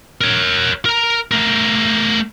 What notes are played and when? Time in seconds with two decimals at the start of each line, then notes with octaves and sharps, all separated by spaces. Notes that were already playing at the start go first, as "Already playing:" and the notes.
0.21 A#4 C#5
0.85 A#4 A#5
1.31 A3 A#4